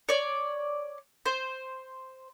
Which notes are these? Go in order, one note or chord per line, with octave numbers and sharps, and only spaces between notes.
C#5 D5
C5